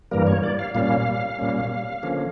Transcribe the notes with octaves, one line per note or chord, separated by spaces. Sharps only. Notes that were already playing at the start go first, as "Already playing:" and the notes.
G2 E3 G3 A#3 A#4
C#5
D5
F5
A#2 G3 A#3 C#4 F5
A#2 G3 A#3 C#4
D3 F3 A#3 C#4